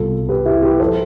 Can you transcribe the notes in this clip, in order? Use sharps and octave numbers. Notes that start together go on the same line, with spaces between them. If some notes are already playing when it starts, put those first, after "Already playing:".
Already playing: C2 B2 G3 F4 A4
G4 B4
E4 G4
G4 B4
F3 A4 C5